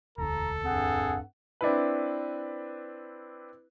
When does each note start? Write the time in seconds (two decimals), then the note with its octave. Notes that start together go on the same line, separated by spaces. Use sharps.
0.18 E1 D2 A4 A#5
0.65 G2 C4 G#4 F#5
1.61 C4 D4 E4 B4